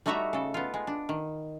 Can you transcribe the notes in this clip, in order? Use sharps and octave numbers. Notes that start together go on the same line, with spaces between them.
G3 A3 D#4 F#4 E5 A#5
C#3 A4
B3 F4
G#3
D4
D#3